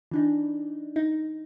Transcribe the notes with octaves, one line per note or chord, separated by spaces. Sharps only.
E3 D4 D#4
D#4